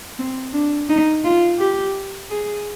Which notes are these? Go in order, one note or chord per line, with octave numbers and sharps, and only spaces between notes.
C4
D4
D#4
F4
G4
G#4